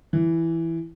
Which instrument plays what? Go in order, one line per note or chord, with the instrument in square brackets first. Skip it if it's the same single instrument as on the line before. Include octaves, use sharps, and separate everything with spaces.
[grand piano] E3